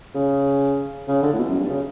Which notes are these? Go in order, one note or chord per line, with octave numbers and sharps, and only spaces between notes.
C#3
C#3
D3
A2
B2
E2
F#2
G2
C#3